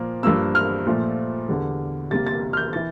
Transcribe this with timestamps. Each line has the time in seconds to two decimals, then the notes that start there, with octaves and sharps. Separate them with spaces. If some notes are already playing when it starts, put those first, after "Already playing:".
Already playing: A#2 F3 A#3
0.23 G2 F3 A#3 E6
0.55 F6
0.86 A#2 F3 A3
1.49 E2 D3 G3
2.11 C3 G3 A#3 A6
2.26 A6
2.53 F6
2.57 G6
2.73 E3 A6